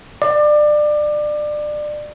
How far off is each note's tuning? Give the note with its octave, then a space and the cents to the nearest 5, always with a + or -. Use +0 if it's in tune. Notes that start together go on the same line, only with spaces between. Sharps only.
D5 +25